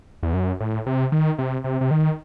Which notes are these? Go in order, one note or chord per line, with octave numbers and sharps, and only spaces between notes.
E2
F#2
A2
C3
D#3
C3
C3
C3
D#3